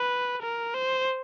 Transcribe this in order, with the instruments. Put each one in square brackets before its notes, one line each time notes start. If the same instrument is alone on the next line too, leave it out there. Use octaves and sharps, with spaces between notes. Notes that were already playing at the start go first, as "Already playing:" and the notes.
Already playing: [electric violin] B4
A#4
C5